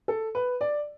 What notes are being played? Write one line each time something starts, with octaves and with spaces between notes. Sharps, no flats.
A4
B4
D5